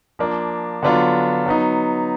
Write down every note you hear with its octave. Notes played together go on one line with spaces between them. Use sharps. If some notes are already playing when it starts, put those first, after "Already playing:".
F3 A#3 D4
D3 F#3 B3 D4 F4
F#3 B3 D#4